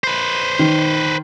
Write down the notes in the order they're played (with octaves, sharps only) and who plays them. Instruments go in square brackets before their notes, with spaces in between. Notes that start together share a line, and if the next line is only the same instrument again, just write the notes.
[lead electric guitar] B4 C5
[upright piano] D#3